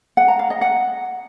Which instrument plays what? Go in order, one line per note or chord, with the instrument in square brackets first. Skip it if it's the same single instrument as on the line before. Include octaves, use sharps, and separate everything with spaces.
[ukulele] F#5
A#5
F5
D#5
F#5